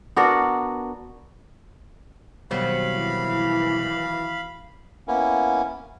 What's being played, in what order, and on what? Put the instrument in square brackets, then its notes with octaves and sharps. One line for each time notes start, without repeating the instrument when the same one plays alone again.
[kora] B3 D4 F#4 A#4
[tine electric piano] B2 G3 [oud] D#3 F#3 C4 [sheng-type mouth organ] F5 B5
[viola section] E3
[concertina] A#3 B3 C#4 E4